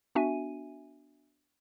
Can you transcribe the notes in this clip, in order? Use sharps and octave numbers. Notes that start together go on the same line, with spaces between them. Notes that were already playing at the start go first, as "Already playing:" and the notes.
B3 D4 F#4 E5 G#5 D#7